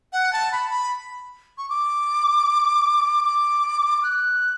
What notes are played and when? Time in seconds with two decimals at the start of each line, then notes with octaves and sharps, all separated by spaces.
0.13 F#5
0.33 A5
0.52 B5
0.71 B5
1.58 C#6
1.70 D6
3.24 D6
4.03 F#6